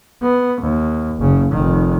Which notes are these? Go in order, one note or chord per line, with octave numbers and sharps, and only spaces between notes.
B3
D#2
F#1 C#3
F1 D#3